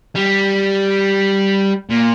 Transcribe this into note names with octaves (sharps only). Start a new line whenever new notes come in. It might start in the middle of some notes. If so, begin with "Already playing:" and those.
G3
A#2